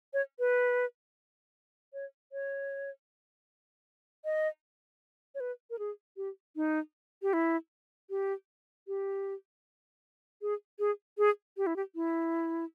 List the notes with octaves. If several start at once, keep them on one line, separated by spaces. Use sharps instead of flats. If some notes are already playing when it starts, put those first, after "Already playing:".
C#5
B4
C#5
C#5
D#5
C#5
B4
A#4
G#4
G4
D#4
G4
E4
G4
G4
G#4
G#4
G#4
G4
E4
G4
E4